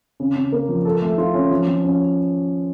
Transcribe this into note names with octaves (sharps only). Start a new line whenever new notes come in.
C#3
C#3
A#3
F3
A4
A3
F4
C#4
F3
F3
C#4